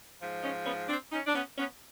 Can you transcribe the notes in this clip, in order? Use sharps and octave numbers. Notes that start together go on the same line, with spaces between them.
G#2 F3
C#4 D#4
B3 C#4
C4 D4
C#4 D#4
D4
B3 C#4
B3 C#4